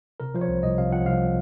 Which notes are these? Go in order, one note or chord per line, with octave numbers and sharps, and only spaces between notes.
C3 A#4
F3 C5
C#5
C2
C2 D#5
C3 F5
F3 F#5
C2 F5